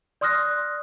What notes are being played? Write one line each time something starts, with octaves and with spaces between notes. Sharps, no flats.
D5 C6 D#6 F6 F#6 A#6